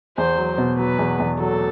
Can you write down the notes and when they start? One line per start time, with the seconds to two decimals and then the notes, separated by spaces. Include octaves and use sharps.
0.17 E2 C5
0.37 F#3
0.58 B2
0.78 F#3 B4
0.99 E2
1.20 E2
1.40 F#3 A4